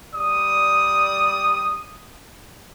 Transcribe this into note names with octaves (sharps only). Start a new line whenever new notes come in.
G3 D5 D#6